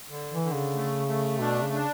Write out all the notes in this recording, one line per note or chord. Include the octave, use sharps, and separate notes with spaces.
D3
E3
D3
C#3
A3
A3
B2 D4
C#3
D4